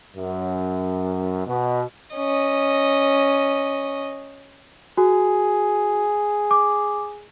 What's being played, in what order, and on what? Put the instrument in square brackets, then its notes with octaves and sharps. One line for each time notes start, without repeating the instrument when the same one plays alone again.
[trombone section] F#2
B2
[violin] C#4 D#5
[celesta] F#4 [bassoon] G#4
[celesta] D6